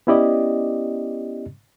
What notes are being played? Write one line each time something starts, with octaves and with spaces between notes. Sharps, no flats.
B3 C#4 E4 G4 D5 D#5